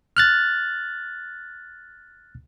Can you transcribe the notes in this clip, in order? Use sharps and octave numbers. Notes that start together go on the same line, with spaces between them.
F6 F#6 A6